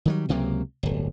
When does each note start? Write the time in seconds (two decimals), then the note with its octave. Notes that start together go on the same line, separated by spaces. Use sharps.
0.05 D#3 F#3 G3
0.29 C#2 C3 F#3 A#3
0.83 D1 G1